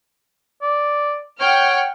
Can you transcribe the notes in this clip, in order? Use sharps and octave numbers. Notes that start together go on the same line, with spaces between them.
D5
C#5 F#5 G5 F6